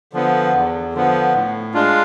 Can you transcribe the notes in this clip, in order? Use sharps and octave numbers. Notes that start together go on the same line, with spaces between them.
D3 F3 B3
E2
D3 F3 B3
A2
G#3 D4 F4